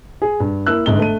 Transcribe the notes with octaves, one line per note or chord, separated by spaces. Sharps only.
G#4
G2
A#3 E4 E6 F#6
G1 G#2 G7
A3 D#7